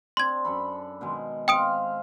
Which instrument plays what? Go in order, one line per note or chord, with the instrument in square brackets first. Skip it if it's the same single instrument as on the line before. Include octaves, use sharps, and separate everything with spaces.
[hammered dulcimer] C4 D4 [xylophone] C6 G#6
[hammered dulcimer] F#2 A4 B5
B2 D#3 G#3
[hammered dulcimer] C4 F5 [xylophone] G5 D#6 D7